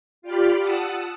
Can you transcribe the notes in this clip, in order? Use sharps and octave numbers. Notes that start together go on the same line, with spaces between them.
F4 G4 D5 F5 G5 B5
F#5 A5 D#6 E6